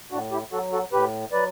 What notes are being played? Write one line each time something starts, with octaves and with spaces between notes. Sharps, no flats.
A2 D4 F#4
E4 G4
F#3 F#4 A4
F#4 A4
A2 G4 B4
F#3 B4 D5